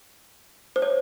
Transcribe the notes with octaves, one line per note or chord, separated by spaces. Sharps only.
C5
C#5